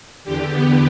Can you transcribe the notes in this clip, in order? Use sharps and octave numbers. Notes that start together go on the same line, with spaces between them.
E2 D3 G4
B3